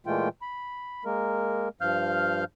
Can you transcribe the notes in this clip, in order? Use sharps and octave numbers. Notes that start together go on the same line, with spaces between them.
A#2 E3 G#3 A3 F4 G5
B5
G#3 A#3 A#4
G2 F3 F5 F6 G6